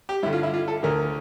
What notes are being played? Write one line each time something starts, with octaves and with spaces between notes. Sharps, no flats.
G4
G2 D3 E4
F4
E4
F4
A4
D2 D3 A#4